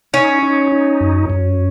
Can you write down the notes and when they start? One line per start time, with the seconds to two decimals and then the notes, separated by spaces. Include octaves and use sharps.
0.13 C#4 D#4
0.43 D#4
0.72 D#4
1.01 F#2
1.30 F#2